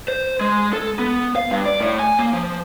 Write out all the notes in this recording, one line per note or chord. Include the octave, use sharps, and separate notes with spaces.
C5
G#3
A4
B3
F5
G2
D5
A2
G#5
A#3
F3